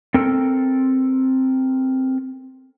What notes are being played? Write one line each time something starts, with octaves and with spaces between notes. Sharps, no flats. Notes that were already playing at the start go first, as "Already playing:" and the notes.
C4 A4 A#4